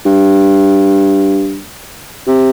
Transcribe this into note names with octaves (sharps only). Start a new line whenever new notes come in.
G2
C3